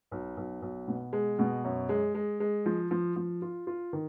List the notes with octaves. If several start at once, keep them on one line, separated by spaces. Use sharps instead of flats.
B1
B1
B1
B2
G#3
B2
F#2
G#3
G#3
G#3
F3
F3
F3
F4
F4
D#3